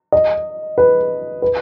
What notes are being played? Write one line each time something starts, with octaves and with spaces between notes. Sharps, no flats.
D#5
B4
B4